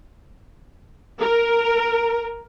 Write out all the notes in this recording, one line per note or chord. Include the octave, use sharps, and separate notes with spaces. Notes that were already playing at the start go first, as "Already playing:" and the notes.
A#4